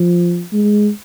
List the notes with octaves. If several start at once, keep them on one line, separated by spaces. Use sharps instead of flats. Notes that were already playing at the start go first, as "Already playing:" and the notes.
Already playing: F3
G#3